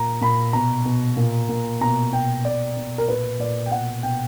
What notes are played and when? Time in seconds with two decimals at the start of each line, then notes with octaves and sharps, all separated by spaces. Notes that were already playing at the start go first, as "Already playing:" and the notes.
Already playing: A#2 A#5
0.21 A#2 B5
0.53 B2 A#5
0.85 B2
1.17 A#2
1.49 A#2
1.81 B2 A#5
2.12 B2 G5
2.45 B2 D5
2.77 B2
2.98 A#4
3.08 A#2 B4
3.39 A#2 D5
3.66 G5
3.71 B2 F#5
4.03 B2 G5